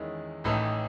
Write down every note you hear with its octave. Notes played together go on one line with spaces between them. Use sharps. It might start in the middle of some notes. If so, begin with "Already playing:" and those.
Already playing: E2 D#3 G#3 C#4 E4
A1 A2 E3 A3 D#4